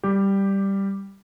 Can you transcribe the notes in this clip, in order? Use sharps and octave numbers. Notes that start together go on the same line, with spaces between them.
G3 G4